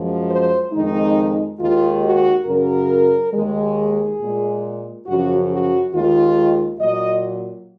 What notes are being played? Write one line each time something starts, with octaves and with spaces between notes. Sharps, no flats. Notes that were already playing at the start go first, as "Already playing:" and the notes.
Already playing: F#2 F3 G#3
C5
F2 D#3 G#3 D#4
D#2 D#3 G#3 F4
F#4
F#2 C#3 F#3 A#4
D#2 D#3 G#3
G#4
A#2 G#3
F#2 C#3 F3 F#4
F#4
D#2 D#3 G#3 F4
A#2 F#3 D#5